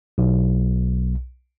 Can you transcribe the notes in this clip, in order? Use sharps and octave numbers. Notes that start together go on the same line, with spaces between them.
B1